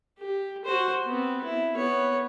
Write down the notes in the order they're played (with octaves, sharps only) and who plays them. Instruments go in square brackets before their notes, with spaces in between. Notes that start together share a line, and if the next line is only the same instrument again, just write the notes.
[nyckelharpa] G4
F#4 C5
B3 C4
E4
B3 C#5